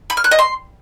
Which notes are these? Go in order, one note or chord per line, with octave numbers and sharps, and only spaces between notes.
B5
F6
F#6
D#5
C6